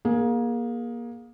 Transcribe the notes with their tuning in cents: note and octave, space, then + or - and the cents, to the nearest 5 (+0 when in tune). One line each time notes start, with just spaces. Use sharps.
A#3 +25 G#4 +0